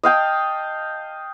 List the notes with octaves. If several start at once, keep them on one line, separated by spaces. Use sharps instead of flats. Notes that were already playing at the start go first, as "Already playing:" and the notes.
D#5 F5 G5 A5